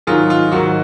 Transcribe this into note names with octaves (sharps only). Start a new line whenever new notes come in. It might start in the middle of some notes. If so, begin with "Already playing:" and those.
G#2 D#3 F#3 F4 G#4
F4
G#2 D#3 F#3 F#4